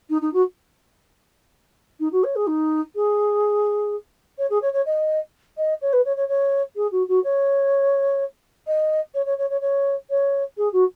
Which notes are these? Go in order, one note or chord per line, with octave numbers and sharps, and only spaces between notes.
D#4
D#4
F#4
D#4
F#4
C#5
G#4
D#4
G#4
C#5
G#4
C#5
C#5
D#5
D#5
C#5
B4
C#5
C#5
C#5
G#4
F#4
F#4
C#5
D#5
C#5
C#5
C#5
C#5
C#5
C#5
G#4
F#4